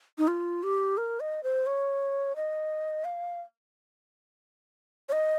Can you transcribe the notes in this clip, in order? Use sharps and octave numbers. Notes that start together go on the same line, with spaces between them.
D#4
F4
G4
A#4
D#5
C5
C#5
D#5
F5
C#5
D#5